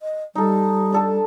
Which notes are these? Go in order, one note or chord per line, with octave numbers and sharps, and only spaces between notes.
D#5
G3 D#4 A4
D4 A4 A5